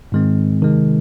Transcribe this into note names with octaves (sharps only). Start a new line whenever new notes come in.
G#2 D#3 G#3 C4
C3 D#3 G#3